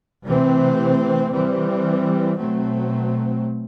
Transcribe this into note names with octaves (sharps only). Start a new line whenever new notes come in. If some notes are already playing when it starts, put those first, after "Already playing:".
C3 E3 A3 C4
E3 G3 C4
B2 F#3 A3 C4